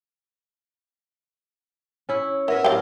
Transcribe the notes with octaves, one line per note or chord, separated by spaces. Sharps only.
C#4 E4
B3 E4 A#4 D#5 E5
A2 F#3 D5 F5 G5